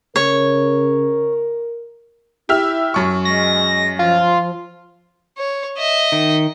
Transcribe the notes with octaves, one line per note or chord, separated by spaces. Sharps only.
C#3 A#4 C#5
E4 G4 E5 F6
F#2 C#6
G#3 A#6
F3 F4
C#5
D#5 E5
D#3